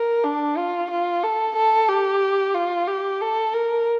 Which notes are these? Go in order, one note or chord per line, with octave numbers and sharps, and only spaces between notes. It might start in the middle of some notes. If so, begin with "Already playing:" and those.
Already playing: A#4
D4
F4
F4
A4
A4
G4
F4
G4
A4
A#4